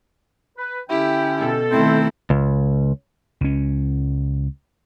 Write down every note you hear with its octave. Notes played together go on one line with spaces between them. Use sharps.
B4
D3 C#4 E4 G4 G5
B2 A4
D#3 A3 C4 E4
C#2
C#2 C#4